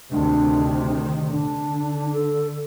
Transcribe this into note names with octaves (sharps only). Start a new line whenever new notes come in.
D2 C3 D#3 D4
D3 D4
A4